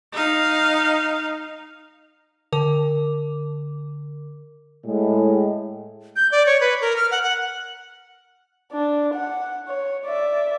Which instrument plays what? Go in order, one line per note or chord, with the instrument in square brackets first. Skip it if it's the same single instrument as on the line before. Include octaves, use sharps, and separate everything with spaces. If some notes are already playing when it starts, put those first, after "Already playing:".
[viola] D#4 F5
[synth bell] D3 A#4 D6
[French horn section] A2 G#3
[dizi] G6
D5
C#5
B4
A#4
F6
F#5
F#5
[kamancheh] D4
F#5
C#5
D5 E5